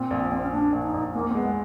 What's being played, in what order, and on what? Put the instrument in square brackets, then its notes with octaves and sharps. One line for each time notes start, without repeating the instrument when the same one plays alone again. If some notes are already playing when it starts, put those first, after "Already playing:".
Already playing: [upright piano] A#2 [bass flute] C4
[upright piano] A#1
[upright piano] A#1 [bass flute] C4
[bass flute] C#4
[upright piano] A#2 [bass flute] D4
[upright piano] A#1
[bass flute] D#4
[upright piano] A#1
[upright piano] E2 [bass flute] A#3
[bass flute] C4
[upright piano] G#3 [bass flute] B3